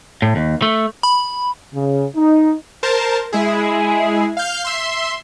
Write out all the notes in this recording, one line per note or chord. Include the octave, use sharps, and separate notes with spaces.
A2
D#2
A3
B5
C#3
D#4
A#4 C5 A5
G#3 E4 G#4
F5 F6 G6
E5 C6